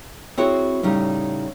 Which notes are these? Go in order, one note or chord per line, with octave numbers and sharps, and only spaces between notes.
C4 E4 F#4 G#4 C#5
A2 C#3 G3 D#4